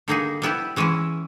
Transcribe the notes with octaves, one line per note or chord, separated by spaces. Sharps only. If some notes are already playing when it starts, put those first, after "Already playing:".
D3 G3 A#3 D#4 G#4
G3 B3 E4 G4
E3 G#3 C#4 E4